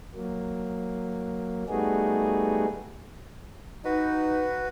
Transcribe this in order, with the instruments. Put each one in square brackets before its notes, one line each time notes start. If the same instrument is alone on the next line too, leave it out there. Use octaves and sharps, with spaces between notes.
[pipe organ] F#3 A#3
G3 A3 B3 D#4 F#4 G#4
[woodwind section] D#4 [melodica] F#4 [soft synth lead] B4